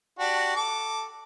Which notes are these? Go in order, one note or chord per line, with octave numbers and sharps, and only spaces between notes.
D4 F#4 G4
A4 D6